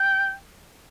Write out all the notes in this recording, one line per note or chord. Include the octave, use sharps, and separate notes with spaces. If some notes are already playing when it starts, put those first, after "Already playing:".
Already playing: G5